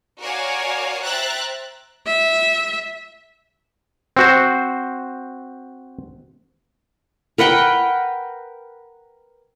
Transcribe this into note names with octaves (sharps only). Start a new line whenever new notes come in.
F#4 A#4 C#5 D5 F5 G#5
C5 E5 G5 A#5 F#6 A6
E5
C4 F#4 C5
A#4 B4 F#5 G5